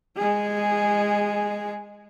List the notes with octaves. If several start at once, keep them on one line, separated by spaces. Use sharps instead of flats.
G#3 G#4